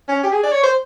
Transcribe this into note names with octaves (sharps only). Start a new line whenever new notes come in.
C#4
G4
G#4
D5
C#5
C5